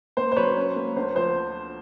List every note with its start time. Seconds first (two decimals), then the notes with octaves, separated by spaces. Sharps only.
0.17 A#3 C5
0.32 C5
0.36 F#3 B4 C#5
0.57 C#4
0.76 A#3
0.96 D2 C5
1.15 F3 C5